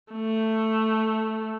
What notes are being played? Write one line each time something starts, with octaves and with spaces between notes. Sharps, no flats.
A3